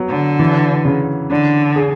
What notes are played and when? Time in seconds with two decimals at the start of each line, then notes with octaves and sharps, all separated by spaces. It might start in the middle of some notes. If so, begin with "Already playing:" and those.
Already playing: F#3 B3
0.09 D3
0.39 E3
0.85 C#3
1.30 D3 D4
1.76 G#4